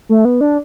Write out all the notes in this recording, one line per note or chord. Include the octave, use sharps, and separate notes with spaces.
A3
B3
D4